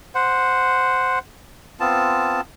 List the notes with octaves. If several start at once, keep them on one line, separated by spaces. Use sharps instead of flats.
C5 F#5
B3 C4 F4 A5